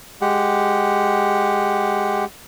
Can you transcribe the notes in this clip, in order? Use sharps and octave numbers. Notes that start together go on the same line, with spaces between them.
G#3 G4 F#5